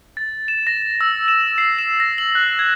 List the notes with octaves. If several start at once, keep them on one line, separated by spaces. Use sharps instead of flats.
A6
E7
A#6
E6
E7
C7
E7
A#6
F#7
F#6
G#6